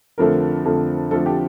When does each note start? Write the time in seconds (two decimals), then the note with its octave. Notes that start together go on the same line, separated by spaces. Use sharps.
0.18 F2 D3 F3 A3 A#4
0.65 F2 D3 F3 A3
1.11 F2 D3 F3 A3 A4
1.26 G4